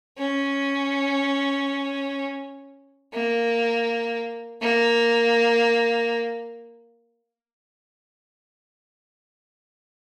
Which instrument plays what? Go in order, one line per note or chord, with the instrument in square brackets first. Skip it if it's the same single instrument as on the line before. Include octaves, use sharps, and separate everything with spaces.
[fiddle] C#4
A#3
A#3